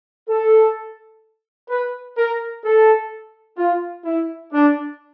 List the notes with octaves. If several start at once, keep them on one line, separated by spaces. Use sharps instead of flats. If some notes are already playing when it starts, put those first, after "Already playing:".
A4
B4
A#4
A4
F4
E4
D4